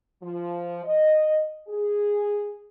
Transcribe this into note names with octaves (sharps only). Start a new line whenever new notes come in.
F3
D#5
G#4